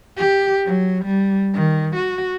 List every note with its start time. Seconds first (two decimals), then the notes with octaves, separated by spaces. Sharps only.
0.17 G4
0.66 F#3
1.05 G3
1.54 D#3
1.96 F#4